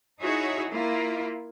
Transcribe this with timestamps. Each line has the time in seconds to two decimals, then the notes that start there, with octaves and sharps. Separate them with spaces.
0.21 D#4 E4 F#4 G#4 C#5 E5
0.70 A#3 E4 F4